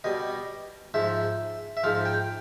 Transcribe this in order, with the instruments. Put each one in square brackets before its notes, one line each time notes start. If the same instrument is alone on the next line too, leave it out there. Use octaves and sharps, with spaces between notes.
[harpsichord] B2 G3 D#5
G#2 F3 E5
E5
G#2 F3 F5
G5